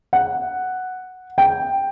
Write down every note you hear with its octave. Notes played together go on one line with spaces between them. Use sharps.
F#5
G5